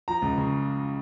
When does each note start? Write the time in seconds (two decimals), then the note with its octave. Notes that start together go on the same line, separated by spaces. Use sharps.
0.08 F3 A#5
0.22 C#2
0.38 C#3